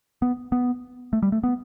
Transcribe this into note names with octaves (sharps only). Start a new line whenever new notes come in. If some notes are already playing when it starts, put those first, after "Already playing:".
B3
B3
A3
G3
A3
B3